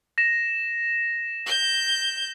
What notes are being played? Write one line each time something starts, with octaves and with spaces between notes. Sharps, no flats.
A#6 E7
G6